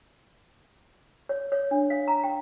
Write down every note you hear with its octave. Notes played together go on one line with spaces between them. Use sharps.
C#5
C#5
D4
F5
A#5
G5